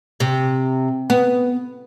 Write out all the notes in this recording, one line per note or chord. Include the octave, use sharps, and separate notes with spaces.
C3
B3